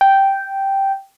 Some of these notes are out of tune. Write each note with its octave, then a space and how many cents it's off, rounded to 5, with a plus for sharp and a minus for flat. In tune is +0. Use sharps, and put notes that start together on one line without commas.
G5 -5